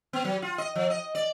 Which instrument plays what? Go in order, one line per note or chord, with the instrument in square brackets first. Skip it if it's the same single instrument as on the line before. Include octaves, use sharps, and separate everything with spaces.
[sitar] B3
F#3
F4
D#5
F3
D#5
D5